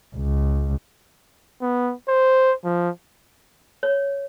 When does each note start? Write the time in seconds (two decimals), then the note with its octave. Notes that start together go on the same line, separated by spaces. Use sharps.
0.16 C#2
1.61 B3
2.08 C5
2.64 F3
3.83 C#5